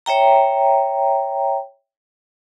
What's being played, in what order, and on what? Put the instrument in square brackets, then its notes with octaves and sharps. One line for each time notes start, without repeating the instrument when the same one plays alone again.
[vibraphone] C#5 E5 G5 A#5